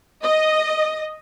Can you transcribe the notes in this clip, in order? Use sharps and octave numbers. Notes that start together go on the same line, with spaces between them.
D#5